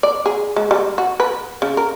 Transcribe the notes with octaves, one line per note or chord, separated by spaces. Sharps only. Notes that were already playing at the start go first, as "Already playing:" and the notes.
D5
G#4
G#3
G3
F#4
B4
C#3
A#4